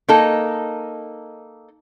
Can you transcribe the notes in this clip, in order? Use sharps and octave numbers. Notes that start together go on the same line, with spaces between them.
A#3 D#4 A4